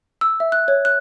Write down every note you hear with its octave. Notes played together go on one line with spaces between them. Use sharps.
E6
E5
F#6
C#5
F#6